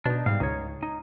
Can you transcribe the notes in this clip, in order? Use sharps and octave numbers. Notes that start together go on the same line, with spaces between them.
B2 D4 D#4
G#2 G3 B3 F5
C#2 D#4 C#5
D#4